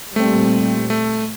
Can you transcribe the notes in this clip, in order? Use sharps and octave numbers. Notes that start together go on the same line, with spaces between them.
A#2 G3 A3 C4
A3